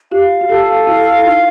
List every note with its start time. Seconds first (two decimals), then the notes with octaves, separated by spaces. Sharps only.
0.11 F4 G4 F5
0.41 F#4
0.49 F4 G4 A4
0.87 E4 F#4 F5
1.19 E4
1.25 D#4 F4 F5